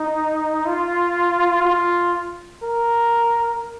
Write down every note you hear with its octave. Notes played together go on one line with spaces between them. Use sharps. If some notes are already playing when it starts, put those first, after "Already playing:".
Already playing: D#4
F4
F4
A#4